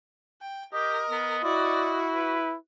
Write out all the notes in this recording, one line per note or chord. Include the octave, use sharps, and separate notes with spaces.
G5
G4 A#4 D#5
B3
E4 F#4 D5
B4